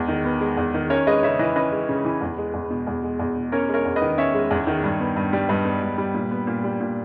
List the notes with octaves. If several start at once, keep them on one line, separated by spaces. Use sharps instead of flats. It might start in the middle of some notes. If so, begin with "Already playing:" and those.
Already playing: E2 G#3 B3
D#3
B3
G#3
E2
D#3
C#4 A#4 C#5
G#3 B4 D#5
C#3 C#5 E5
E3 B4 D#5
C#4 B4 D#5
G#3
C#3
E3
E2
G#3
E2
B2
E2
G#3
E2
B2
C#4 A#4 C#5
G#3
A#4 C#5
E2
B4 D#5
D#3
C#4 C#5 E5
G#3
E2
D#3
G2
B3
G2
G3
G2 B4 D#5
B3
G2
G3
A#2
B3
A#2
G3
A#2